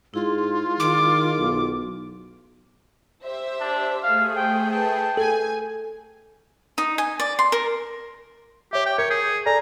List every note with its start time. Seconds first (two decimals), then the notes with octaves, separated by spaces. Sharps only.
0.14 G#2 E4 F4 G#4 C6
0.80 D#3 D6
1.38 B1
3.24 G4 C5 E5
3.60 D4
4.03 A3 G#4 F5
4.36 C5 G5
4.71 B4 G5 A5
5.17 A4 G#5
6.78 D#4
6.98 G#5
7.20 D5
7.39 C6
7.52 A#4
8.73 G4 C#5 E5
8.86 G5
8.98 A#4 C#5
9.10 G#4 G6
9.46 A4 D5 G#5 A#5